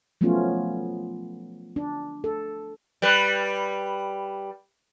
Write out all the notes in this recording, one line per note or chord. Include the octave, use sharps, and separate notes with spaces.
F3 F#3 A3 B3 C#4 F4
D4
A4
G3 B4